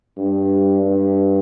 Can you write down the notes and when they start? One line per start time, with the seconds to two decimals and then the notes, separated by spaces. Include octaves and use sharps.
0.18 G2
0.84 G2